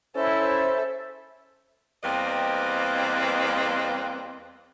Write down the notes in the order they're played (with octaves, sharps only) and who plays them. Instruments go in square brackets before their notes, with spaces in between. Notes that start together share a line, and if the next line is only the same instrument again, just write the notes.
[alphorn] C#4 [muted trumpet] E4 [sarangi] A4 [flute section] C5 E5
[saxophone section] E2 G3 A#3 C4 B4 D#5